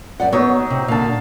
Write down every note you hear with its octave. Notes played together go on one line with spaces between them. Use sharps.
F#2 D5 F#5
F#3 B3 D#4 C#5
C3
A#2 D3 F5 A5